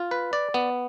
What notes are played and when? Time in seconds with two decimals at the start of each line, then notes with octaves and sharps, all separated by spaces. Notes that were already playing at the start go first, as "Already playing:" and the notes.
Already playing: F4
0.11 B4
0.33 D5
0.54 B3